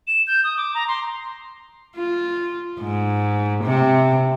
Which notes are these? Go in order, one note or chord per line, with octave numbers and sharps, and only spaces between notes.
E7
G6
D#6
D6
A#5
C6
F4
G#2
C3